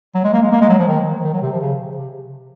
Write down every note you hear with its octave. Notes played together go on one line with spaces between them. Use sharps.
F#3
G#3
A#3
G#3
A#3
G#3
F#3
F3
D#3
D#3
F#3
C3
F3
C#3
C3